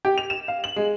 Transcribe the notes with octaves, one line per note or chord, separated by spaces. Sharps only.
G4
F7
E7
F5
F#7
G#3